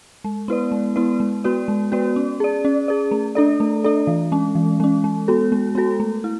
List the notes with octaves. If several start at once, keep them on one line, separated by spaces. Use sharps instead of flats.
G#3
B3 E4 B4 D5
G#3
B3 E4 B4 D5
G#3
B3 F#4 B4 D5
G#3
B3 F#4 B4 D5
C#4
G#4 D5
C#4
G#4 D5
A3
D4 A4 D5
A3
D4 A4 D5
E3
G#3 C#4
E3
G#3 C#4
G#3
B3 F#4 A4
G#3
B3 F#4 A4
A3
E4